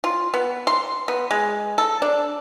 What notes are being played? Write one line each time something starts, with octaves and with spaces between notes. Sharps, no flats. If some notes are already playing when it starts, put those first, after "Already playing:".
F4
B3
C6
B3
G#3
A4
D4